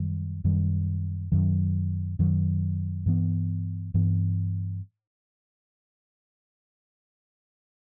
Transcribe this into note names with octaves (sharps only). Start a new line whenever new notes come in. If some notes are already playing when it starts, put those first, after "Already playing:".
Already playing: F#2 D#3 G3
F#2 D#3 G3
F#2 D#3 F#3
F#2 D#3 F#3
G2 E3 B3
G2 E3 B3